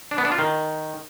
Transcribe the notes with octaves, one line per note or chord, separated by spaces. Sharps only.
D4
B3
D4
F4
D#3